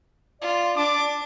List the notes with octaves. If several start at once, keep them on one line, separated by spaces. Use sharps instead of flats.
F4 D5
D4 D6